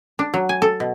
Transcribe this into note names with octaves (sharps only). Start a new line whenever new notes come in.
D4
F#3
G#5
A4
B2